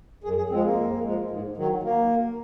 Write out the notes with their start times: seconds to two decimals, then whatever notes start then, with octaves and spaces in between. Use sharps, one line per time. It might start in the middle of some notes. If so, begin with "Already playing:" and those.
0.24 F#2 G#4
0.37 G#4
0.50 F3 G#3 C4
0.64 A#3
0.78 F#2
1.03 F3 G#3
1.30 G#2
1.57 D#3 F#3
1.83 A#3